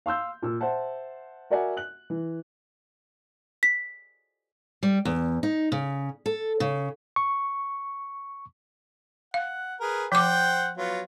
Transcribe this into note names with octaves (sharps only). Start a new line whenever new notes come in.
F5 C6 E6 G6
A#2 E6
C5 E5 F#5 A5
F#4 A#4 D5 E5 F#5 G#5
F#6 F#7
E3
B6
G3
E2
D#4
C#3
A4
C#3
C#6
F5 F#5
G#4 A#4 B4
F3 C5 F#5 G5 D6
F#3 B3 F4